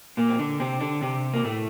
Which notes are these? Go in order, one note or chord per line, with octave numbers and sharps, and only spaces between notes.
A#2 A#3
C4
D3 D4
C3 C4
D3 D4
C3 C4
A#3
A2 A3